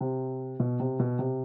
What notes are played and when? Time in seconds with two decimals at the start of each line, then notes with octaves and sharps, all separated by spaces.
0.01 C3
0.60 B2
0.80 C3
0.99 B2
1.19 C3